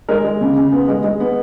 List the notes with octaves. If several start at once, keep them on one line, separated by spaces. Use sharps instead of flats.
G#3 A#4
G#3
C#3
C#3
B3
G#3
G#3
B3